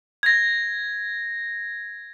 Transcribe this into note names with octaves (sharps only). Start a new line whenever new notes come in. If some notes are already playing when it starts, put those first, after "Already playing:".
G#6 A#6